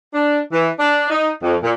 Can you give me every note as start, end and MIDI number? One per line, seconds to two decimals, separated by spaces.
0.14 0.39 62
0.52 0.68 52
0.79 1.09 62
1.10 1.30 63
1.43 1.57 41
1.63 1.72 46